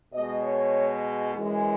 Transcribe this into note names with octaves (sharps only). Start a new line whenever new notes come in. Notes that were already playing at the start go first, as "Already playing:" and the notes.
B2 G#3 D#5
C#5
F#2 E3 G#3